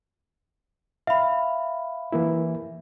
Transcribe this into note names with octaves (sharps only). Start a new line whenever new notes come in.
E5 F5 B5
E3 A#3 E4